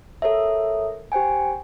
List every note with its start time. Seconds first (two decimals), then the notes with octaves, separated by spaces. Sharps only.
0.22 A4 A#4 C#5 E5
1.12 G4 C5 G5 G#5